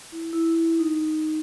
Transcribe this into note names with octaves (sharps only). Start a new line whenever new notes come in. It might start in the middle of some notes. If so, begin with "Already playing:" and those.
E4
E4
E4
D#4